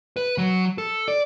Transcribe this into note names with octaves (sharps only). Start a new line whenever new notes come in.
B4
F#3
A4
D5